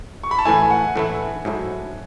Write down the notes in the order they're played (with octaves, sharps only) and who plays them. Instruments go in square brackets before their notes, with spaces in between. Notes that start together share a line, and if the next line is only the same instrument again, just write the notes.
[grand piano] C#6
B5
A5
[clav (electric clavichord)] A2 E3 A3 E4 [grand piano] G#5
[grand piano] F#5
[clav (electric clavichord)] A2 E3 A3 E4
G#2 F#3 A3 E4